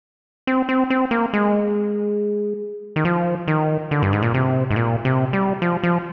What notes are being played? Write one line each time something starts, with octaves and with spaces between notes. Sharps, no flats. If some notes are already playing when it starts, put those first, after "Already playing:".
C4
C4
C4
A#3
G#3
D#3
F3
D#3
D3
G2
G#2
A#2
C3
G#2
A#2
C3
G3
F3
F3